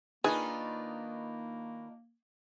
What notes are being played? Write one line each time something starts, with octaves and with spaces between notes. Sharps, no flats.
D#3 A#3 D4 D#4 F4 G#4 B4